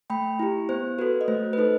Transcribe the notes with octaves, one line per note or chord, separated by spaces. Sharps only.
A3 G5 B5
E4 G4
B3 C5
F#4 A4 B4
D#5
A3 C5
B4
D#4 A4 C5